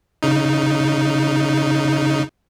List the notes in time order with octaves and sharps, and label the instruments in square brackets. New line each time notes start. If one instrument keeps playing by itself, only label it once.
[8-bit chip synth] C#3 D#4